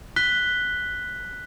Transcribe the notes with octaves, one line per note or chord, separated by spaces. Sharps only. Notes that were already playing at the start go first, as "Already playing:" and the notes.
F#6 B6 G7